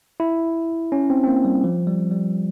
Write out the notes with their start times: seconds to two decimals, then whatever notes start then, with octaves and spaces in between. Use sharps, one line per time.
0.20 E4
0.92 C#4
1.10 C4
1.24 C4
1.28 A#3
1.45 G3
1.64 F3
1.87 G3
2.11 G3